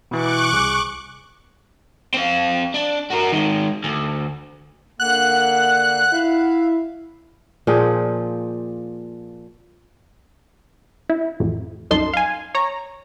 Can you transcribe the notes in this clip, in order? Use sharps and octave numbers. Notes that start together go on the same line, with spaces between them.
B2 E3 B3 C#6 D6 F#6
C2 G#4
C4 F5
D4
F#4 A#4
D#3 G#3
D2
D3 A#3 F#5 F#6
E4 E5 F5
A#2 F3 G#4 G5
E4
A1 F2
C2 F#2 D#4 A5 C6
F5 G#5
C#5 A#5